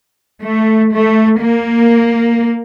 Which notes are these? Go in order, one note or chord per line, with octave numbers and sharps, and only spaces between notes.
A3
A3
A#3